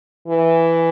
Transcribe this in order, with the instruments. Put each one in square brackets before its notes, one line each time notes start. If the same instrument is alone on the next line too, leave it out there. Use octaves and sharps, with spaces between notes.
[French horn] E3